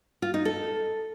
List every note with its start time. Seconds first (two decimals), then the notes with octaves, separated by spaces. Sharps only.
0.22 F4
0.34 D#4
0.45 A4